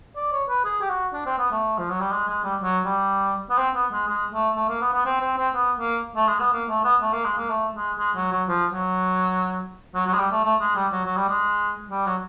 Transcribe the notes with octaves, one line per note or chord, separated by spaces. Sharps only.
D5
C#5
B4
G#4
G4
F#4
D4
C4
B3
A3
F3
F#3
G3
G#3
G#3
G3
F#3
G3
B3
C4
B3
G#3
G#3
A3
A3
A#3
B3
B3
C4
C4
C4
B3
A#3
A3
G#3
B3
A#3
A3
B3
A3
A#3
G#3
A#3
A3
G#3
G#3
F#3
F#3
F3
F#3
F#3
F#3
G#3
G3
A3
A3
G#3
G3
F#3
F#3
G3
G#3
G3
F#3